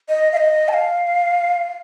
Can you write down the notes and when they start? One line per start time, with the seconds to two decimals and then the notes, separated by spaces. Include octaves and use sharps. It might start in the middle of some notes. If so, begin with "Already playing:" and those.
0.09 D#5
0.33 F5
0.37 D#5
0.68 A5
0.73 F5